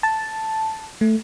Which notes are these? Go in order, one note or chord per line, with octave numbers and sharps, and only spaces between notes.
A5
A3